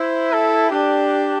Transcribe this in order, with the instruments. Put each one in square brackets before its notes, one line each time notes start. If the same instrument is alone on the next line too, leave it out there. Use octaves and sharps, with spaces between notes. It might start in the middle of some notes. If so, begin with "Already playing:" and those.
Already playing: [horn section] E4 [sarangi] C5
[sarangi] A4
[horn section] D4 [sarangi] G4